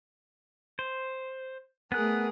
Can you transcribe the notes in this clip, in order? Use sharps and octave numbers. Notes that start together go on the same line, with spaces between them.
C5
A3 B3 G#4 A#4 F#6